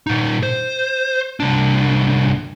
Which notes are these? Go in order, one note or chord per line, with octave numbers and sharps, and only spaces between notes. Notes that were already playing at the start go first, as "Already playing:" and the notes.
A#2 D#4
C5
C2 D4